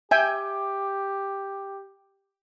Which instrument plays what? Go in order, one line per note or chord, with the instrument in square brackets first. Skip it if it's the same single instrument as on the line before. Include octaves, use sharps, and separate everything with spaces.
[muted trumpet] G4 [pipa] E5 [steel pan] G5 G#5